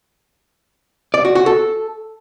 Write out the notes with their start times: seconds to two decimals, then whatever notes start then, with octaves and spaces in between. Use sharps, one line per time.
1.14 D5
1.25 F#4
1.35 F#4
1.46 A4